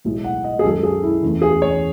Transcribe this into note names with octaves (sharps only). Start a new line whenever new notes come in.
B1 A2 G#3
F#5
D#5
G#4
F#2 D#3 G#3 A4
G#4
E4
E2 C#3 E3 A3
G#4
C#5